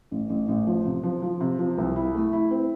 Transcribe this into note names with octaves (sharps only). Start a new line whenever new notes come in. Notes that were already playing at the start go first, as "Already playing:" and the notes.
A1
A1
A1
F3
C3
F3
F3
C3
F3
C2
E4
A3
E4
C4